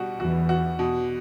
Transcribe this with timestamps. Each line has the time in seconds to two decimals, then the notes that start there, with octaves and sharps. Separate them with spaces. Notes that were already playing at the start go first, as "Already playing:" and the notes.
Already playing: B2 G3 F#4
0.19 E2 E3 F#4
0.49 F#4
0.79 B2